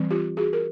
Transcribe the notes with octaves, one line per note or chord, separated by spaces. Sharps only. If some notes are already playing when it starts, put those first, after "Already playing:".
Already playing: E3 G3 C4
F4 G4
F#4 G#4
A#4